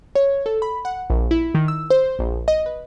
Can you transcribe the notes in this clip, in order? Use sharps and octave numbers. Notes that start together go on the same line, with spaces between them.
C#5
A4
B5
F#5
A#1
E4
D#3
E6
C5
A#1
D#5
B4